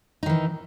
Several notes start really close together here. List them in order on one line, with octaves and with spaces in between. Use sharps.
D#4 D#3 E3